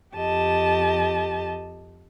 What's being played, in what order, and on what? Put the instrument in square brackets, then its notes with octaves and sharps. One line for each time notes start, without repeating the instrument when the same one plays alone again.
[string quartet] F2 G4 D#5 A5